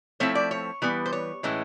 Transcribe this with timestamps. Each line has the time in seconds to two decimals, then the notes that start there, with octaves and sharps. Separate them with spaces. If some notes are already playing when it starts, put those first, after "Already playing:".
0.20 F3 A3 C4 E4 C#5
0.35 D5
0.51 C#5
0.82 E3 G3 B3
1.06 C5
1.13 C#5
1.43 A2 E3 G#3 C#4